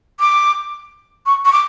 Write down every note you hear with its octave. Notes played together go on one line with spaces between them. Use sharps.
D6
C#6
C#6
D6